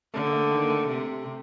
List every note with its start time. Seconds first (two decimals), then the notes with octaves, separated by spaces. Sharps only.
0.14 D3 A3
0.27 A#3
0.33 A3
0.51 D#3
0.63 A#3
0.69 A3
0.88 C3